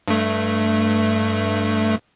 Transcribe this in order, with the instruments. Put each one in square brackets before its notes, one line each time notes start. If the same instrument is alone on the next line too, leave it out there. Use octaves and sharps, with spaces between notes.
[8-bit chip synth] G2 A3